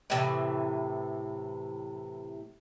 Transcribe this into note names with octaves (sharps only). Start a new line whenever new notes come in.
A2 C3 E3